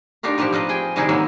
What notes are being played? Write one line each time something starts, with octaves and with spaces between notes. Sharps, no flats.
D4 D#4 F4 G4 A#4
F3 A#3 G4 A#4 B4
C4 F4 B4 D#5
G#4 G5 G#5
C3 D#3 G3 D#4 E4 G#4
F#3 G#3 A#3